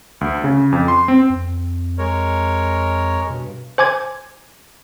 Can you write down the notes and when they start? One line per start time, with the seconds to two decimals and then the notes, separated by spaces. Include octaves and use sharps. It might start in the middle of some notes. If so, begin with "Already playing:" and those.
0.21 D2
0.44 C#3
0.72 F2
0.88 C6
1.08 C4
1.30 F2
1.98 G#3 A#4 C#5
3.30 G2 B2
3.78 C5 G#5 D6 G#6